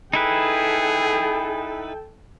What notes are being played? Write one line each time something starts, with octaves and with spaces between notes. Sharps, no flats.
D#4 E4 G#4 A4 B4 G5